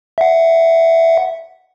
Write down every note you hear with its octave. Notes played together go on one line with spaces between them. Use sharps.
E5 F#5